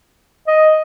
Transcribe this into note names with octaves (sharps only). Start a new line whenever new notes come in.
D#5